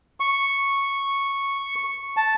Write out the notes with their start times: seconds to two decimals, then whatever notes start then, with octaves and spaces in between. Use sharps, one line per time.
0.20 C#6
2.17 A5